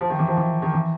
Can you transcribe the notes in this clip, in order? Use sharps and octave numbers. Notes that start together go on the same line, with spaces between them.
F3
D#3
E3
F3
E3
D#3
E3